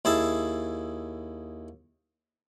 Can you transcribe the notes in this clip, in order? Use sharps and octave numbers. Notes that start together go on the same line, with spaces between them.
D#2 E4 G#4 A5